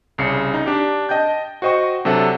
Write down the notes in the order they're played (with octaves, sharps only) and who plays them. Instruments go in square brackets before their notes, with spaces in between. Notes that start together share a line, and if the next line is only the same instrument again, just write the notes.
[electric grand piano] C2 C#3 C7 C#7
D#4
D4 G4
D#5 G5 A5 G6
F#4 C5 D#5 G5 C#6
C3 F#3 D4 A4 E5 F#5